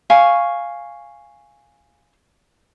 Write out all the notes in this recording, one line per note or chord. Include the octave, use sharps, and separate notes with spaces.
F5 G#5 C#6